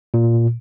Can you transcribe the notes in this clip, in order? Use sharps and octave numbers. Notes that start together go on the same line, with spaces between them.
A#2